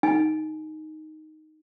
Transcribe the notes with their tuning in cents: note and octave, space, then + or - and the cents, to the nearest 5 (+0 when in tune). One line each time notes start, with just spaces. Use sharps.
D#4 +0 G#5 +20